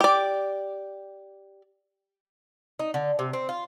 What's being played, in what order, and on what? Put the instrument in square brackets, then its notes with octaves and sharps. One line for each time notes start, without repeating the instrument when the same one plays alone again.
[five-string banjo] G4 D5
[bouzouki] D#4
D3
C3
C4
F4